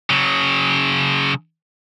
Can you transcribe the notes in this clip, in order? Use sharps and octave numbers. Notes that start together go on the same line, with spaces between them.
C#3 F#3